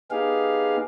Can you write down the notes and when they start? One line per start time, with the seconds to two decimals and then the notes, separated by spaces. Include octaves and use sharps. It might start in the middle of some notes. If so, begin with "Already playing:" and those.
0.11 B3 D#4 G4 G#4 F5